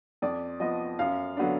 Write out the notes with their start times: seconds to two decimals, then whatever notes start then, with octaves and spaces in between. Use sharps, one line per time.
0.22 F2 D5
0.60 F3 B3 D#5
0.99 F#2 F5
1.37 D3 F#3 B3 D4